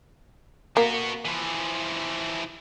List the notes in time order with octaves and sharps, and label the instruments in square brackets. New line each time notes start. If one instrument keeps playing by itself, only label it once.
[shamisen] A#3 [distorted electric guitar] B3 F#4
[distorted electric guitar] E3 F3